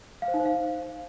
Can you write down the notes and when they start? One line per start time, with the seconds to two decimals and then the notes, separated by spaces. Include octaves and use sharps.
0.22 F5
0.28 C5
0.34 D#4
0.40 C5
0.45 F5